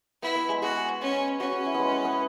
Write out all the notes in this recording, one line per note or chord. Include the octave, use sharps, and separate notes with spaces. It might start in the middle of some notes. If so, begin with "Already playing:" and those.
B3 E4
B3
G#3
F#4 G#4
C#4
C#4 F#4
F#4
E4
G#3 B3
B3
B3